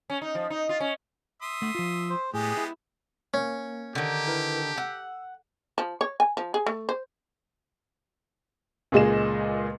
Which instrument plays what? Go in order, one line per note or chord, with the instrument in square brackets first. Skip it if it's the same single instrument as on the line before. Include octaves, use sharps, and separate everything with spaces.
[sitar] C#4
D#4
F3
D#4
F4
C#4
[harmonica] E5 C6 D#6
[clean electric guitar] A3 F#5
F3 F4
[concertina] C5
[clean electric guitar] A2 [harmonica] G#3 B3 G4 [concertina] G#4
[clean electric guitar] E4
[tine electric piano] A#3 [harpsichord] C#4
[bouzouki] D3 D#3 [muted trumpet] G4
[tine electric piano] E4 A#4 B4
[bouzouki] F#5 [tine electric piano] E6
[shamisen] F3
C#5
G#5
F3
G#4
A3
C5
[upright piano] C#2 A#2 G#3 G#4 D#5 E7